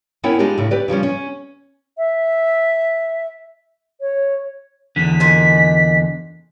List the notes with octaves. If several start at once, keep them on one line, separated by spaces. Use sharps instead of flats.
B3 C#4 E4 A#4 C#5 G5
G#3 D4 D#4 F4 G4
A2 C#3
G4 B4 D5
C#3 F3 G3 C#4
C#4
E5
C#5
E2 D3 B6
A#2 D#5 G#5